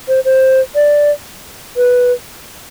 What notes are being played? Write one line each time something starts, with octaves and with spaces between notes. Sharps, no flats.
C5
C5
D5
B4